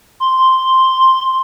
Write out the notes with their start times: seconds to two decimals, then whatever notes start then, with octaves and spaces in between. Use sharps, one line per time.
0.20 C6